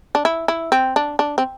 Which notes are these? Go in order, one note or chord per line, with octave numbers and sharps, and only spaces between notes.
D4
E4
E4
C4
D4
D4
C4